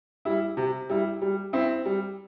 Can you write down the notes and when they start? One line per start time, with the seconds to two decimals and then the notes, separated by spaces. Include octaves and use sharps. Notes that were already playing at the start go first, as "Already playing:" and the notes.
0.25 G3 E4
0.57 C3
0.90 G3 E4
1.22 G3
1.53 C4 E4
1.85 G3